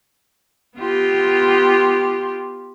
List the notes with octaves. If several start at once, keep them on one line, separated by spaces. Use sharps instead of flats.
B3 F4 G4